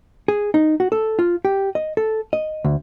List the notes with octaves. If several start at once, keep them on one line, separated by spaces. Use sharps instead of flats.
G#4
D#4
F#4
A4
F4
G4
D#5
A4
D#5
D2